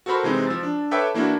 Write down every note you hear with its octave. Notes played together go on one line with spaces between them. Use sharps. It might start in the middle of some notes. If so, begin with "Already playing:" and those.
F#4 A4 A#4 C5 B5 C#6
C3 E3 G#3 C4 D#4
F3 E6 A6
D4
A4 B4 C#5 E5 G5 D6
E3 A#3 D4 E4 F#4